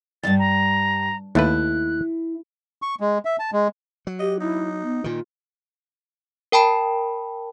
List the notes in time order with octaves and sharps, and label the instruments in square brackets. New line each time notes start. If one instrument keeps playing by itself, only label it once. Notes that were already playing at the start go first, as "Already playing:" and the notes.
[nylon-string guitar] E2 G2 [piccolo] A6
[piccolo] A#5
[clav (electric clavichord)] D#2 A3 B4 [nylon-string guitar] E4 [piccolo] F#6
[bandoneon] C#6
G#3
E5
A5
G#3
[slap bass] F#3
[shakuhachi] G4 [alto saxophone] D#5
[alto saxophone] D#4 [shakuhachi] E4
[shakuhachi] B3
[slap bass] A#2 D#3 [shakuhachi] F4
[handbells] A#4 G5 A5 B5